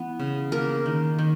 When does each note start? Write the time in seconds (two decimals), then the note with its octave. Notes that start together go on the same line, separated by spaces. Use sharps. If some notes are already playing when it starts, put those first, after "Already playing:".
Already playing: E3 B3
0.20 C#3
0.52 A#3 A#4
0.86 D#3
1.19 D#3